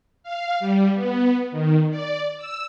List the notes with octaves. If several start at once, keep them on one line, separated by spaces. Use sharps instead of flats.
F5
G3
B3
D#3
D5
E6